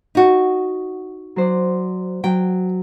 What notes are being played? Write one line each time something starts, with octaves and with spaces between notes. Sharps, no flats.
D#4 F#4
F#3 C5 D5
F#3 G5